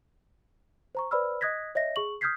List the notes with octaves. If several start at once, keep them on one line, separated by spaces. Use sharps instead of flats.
C5 A#5 C#6
B4 C5 D5 B5 E6 F6
D#5 D#6 F#6 G#6 A#6 B6
C#5 D#5 E5 A#6
G#4 C#6 F#7
D#6 F6 G6 G#6 B6 C7